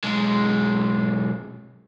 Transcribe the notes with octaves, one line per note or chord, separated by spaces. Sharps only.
B1 G#3